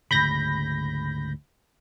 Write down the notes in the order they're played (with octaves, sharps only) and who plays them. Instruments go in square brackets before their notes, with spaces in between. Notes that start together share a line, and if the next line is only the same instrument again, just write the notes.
[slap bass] D2 G#2 C#3 [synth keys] B5 G6 A#6